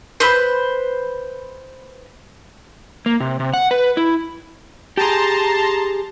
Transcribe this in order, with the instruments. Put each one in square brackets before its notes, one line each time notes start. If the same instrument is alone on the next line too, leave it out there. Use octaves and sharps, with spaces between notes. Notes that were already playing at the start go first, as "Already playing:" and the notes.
[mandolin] B4 C5
[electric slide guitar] A#3
C3
C3
F#5
B4
E4
[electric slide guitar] G4 G#4 [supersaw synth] A5 A#5 C6